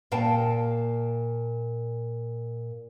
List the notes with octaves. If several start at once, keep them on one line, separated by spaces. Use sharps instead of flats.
A#2 F5 G5 A5